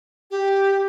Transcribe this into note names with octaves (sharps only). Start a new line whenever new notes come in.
G4